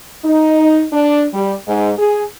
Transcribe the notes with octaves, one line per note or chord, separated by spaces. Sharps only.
D#4
D4
G3
G#2
G#4